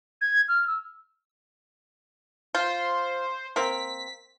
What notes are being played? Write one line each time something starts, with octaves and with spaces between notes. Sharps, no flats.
G#6
F6
E6
F4 C5
A#3 C4 B6